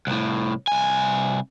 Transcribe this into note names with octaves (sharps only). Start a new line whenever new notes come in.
C2 A2
C2 G#5